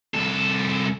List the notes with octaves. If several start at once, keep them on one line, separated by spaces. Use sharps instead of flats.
C2 A4